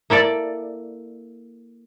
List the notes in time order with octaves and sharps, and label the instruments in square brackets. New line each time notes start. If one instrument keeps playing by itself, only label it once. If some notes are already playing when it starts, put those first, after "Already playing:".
[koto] A#3 E4 A4 D5